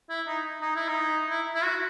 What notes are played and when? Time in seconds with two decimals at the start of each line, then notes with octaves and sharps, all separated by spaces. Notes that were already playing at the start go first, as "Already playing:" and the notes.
0.10 E4
0.27 D#4
0.62 D#4
0.76 E4
0.88 D#4
1.30 E4
1.55 E4
1.64 F#4